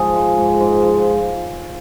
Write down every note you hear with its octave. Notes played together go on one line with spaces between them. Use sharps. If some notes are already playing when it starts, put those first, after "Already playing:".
Already playing: G#2 F3 G#4
G#3
G#2
G#2
F3